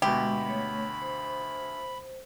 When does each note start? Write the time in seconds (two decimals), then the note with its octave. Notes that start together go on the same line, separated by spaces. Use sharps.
0.02 D2 B2 G#3 G4 B5
0.47 A3 C#5
1.02 C5